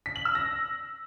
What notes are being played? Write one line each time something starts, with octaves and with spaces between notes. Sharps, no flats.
B6
F#7
E6
A#6